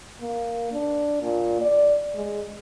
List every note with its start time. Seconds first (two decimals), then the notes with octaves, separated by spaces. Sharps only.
0.21 A#3
0.72 D4
1.22 A#2
1.61 D5
2.15 G#3